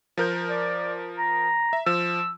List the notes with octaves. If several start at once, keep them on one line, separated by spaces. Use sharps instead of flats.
F3 A#4 G6
D5
A#5
E5
F3 E6